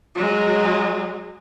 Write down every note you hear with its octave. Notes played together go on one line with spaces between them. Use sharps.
F#3 G#3